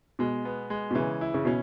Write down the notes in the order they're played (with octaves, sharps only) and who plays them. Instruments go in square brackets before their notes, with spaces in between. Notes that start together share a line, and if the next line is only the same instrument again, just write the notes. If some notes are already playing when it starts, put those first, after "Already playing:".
[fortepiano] B2 [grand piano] G#3
[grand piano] B3
G#3
[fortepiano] B2
[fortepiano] C#3 [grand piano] E3
[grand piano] E4
[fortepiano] C#3
[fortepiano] B2 [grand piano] C#4